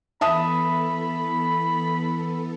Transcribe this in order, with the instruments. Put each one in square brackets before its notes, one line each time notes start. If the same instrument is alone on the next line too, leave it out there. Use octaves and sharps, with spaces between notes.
[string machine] E3 B3 A4 [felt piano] E5 A5 D#6 [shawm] B5